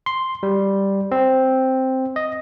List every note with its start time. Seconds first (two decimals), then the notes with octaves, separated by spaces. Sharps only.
0.06 C6
0.43 G3
1.12 C4
2.16 D#5